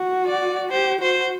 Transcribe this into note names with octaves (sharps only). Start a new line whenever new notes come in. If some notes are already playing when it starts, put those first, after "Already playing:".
Already playing: F#4
D5
G4 C5
F#4 C5